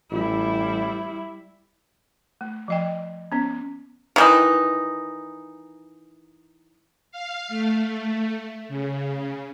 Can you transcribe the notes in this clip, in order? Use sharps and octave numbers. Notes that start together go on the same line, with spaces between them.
A1 G3 E4
A3
F3 D#5 G5
B3 C#4
D#3 E3 D#4
F5
A3
C#3